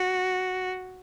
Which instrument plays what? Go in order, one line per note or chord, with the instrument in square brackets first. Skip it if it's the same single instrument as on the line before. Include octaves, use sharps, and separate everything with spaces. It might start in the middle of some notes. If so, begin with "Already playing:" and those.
Already playing: [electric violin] F#4